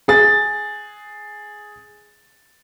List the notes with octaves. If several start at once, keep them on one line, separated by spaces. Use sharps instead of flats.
G#4 A6